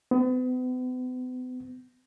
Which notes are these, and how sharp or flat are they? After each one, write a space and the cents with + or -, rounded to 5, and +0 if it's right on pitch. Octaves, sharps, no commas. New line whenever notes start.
B3 +40